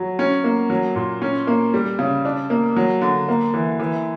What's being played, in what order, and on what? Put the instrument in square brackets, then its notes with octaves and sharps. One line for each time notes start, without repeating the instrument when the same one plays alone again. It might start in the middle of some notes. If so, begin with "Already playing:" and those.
Already playing: [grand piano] F#3
C#4
A#3
F#3
A#2
C#4
A#3
G3
C#3
D4
A#3
F#3
D3
A#3
E3
E3